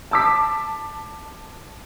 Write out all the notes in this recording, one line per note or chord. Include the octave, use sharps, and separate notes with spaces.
A5 D6 B6